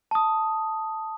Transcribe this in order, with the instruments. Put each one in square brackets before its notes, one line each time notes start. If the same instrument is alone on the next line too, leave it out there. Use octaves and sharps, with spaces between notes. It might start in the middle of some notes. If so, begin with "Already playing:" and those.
[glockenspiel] A5 D#6